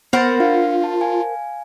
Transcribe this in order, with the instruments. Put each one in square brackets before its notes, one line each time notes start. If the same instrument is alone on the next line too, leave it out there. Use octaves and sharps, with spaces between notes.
[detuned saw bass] B3 [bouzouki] A#4 C5 F#5 [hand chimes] B5 A6
[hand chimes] D4 F5 [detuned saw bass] F4
[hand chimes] A5
F5 G#5